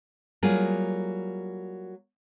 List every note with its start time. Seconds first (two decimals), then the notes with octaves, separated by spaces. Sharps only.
0.43 F#3 G3 A#3 F4 G#4